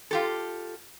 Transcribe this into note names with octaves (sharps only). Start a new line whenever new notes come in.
F4 G4 A4